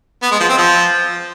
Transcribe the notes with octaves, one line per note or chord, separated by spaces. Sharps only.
B3
G#3
F3
C4
F3